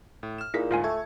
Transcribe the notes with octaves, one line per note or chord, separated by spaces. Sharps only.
A2
F6 E7
A#2 D#4 E4 G#4 B6
D2 G#2 F4 F5 G#5
A3 A5 C#6 G#6